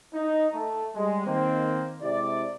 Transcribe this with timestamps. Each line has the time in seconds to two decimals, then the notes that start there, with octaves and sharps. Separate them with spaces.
0.14 D#4
0.53 A3
0.95 G3 G#3
1.26 D#3 A#3 C4
2.02 C3 G#3 E4 G4 D5